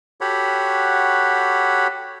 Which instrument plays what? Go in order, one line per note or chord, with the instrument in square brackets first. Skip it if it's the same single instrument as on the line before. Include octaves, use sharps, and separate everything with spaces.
[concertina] F#4 G4 A4 C#5 F#5 B5